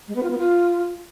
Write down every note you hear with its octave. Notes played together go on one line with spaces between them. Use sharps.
G#3
B3
F4
B3
F4